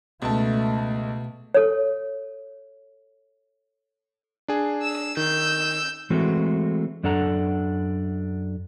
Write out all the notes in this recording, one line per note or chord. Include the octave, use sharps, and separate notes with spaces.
C#2 B2 A3 A5
A4 C#5
D4 G#4
E6 E7
D#3 E6 G6
E3 G#3 A3 C4 F#4
F#2 D4 A4 F#5 A#5